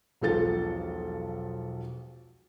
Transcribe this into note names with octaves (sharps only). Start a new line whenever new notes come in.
E1 B1 F3 A4 A6